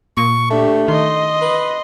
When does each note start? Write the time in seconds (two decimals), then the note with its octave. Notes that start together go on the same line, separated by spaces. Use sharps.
0.17 A#2 C#6
0.50 A3 D4 G4
0.88 D#3 D#5 C6
1.42 B4